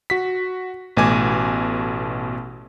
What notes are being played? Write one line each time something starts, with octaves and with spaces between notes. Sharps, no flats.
F#4 B6
A1 B2 A3 G#5 D6 G#6